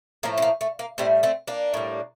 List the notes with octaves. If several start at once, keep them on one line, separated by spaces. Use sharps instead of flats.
A2 F3 A3 A#3
C4
A#3
A3
A#3
A2 G3 A3 C4
A3 C4
A#3 D4
A2 G3